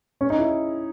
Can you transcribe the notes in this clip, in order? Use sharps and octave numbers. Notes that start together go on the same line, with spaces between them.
C#4
D#4
E4